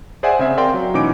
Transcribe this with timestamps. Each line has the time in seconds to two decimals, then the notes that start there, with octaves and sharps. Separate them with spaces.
0.23 G#4 C5 D5 E5 F#5 G#5
0.39 C#3 C4 E5
0.57 A#4 D5 F5 G5 C6
0.74 F#3
0.94 B2 E3 C#4 D#4 D6 D7